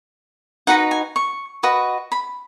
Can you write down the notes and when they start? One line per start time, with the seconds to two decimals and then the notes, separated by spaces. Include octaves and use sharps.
0.67 D#4 F#4 B4 F#5
0.91 G#5
1.16 C#6
1.63 F#4 B4 D#5
2.12 B5